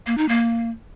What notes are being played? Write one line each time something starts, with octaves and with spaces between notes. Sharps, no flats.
A#3
D#4
A#3